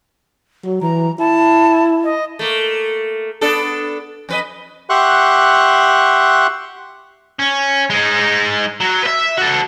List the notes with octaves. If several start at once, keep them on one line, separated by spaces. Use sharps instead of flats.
F#3
E3 A#5
E4 A5
D#5
A3 A#3
B3 D4 A4
F2 B4 D#5
G4 E5 F#5 C6 C#6 F#6
C#4
G#3 D#4
F#3
B4 E5
F#4 A4